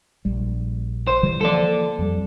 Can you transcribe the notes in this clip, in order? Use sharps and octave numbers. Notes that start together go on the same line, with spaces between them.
A#1 G3
C5
D3 E3 G3
E3 F3 A#3 A4 D5
F2 F3 G3